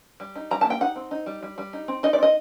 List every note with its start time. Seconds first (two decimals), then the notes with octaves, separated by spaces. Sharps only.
0.20 G3
0.35 D#4
0.51 G3 A#5
0.61 A5
0.65 A#3
0.70 G5
0.81 D#4 F#5
0.96 C4
1.11 D#4
1.26 G3
1.43 G3
1.58 G3
1.73 D#4
1.88 C4
2.03 D#4 D#5
2.13 D5
2.19 C4 D#5